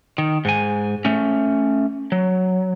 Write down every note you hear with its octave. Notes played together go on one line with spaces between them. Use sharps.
D#3
G#2 G#5
A3 C#4
F#3